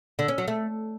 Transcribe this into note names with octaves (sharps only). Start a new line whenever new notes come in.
D3
C#4
F#3
A3